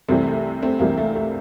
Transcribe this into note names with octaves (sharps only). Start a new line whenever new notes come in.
C2 C3 E3 G3 A3 C4
A3
A3 C4
C2 C3 E3 G3 A#3
A3
A3